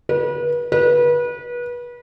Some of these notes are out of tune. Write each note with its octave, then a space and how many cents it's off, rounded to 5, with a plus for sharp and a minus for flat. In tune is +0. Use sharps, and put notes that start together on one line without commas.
B4 -35
B4 -30